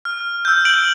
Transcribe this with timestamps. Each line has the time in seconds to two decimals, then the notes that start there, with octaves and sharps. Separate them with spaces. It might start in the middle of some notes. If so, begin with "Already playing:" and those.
0.05 F6
0.45 E6 G6
0.65 G6 D7 F#7